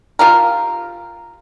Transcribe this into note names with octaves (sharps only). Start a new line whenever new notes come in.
F4 G4 A#4